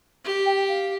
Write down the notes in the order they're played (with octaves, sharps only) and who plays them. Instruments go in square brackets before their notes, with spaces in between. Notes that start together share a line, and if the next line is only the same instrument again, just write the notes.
[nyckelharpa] G4
[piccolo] G5
F5